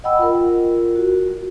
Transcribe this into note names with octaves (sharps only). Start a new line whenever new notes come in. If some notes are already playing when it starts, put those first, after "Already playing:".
D#5 F#5 G5 B5 E6
F4 A#4
F#4